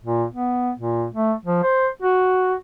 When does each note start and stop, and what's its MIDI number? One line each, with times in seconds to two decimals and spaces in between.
0.04 0.25 46
0.33 0.72 59
0.77 1.06 46
1.14 1.33 57
1.45 1.63 53
1.63 1.88 72
2.02 2.54 66